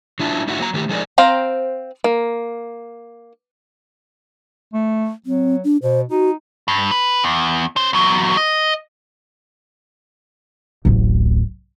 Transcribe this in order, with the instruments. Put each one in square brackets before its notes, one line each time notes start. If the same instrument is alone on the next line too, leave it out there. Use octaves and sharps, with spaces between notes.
[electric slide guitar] F#3 D4 E4 F4 A5
A3 D#4 E4 F#4 F#5
F#3 A#3 A#5
D#3 A3 G4
F3 G#3 D#4 G#4 A#4 D5
[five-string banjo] C4 C5 F5 G5 A#5
A#3
[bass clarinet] A3
[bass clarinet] F#3 [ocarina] C4
[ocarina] D4
[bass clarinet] B2 [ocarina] C5
[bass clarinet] D#4 [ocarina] F#4
[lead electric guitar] G2
B4
E2
C#4 C5
E2 F#3
D#5
[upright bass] D1 A1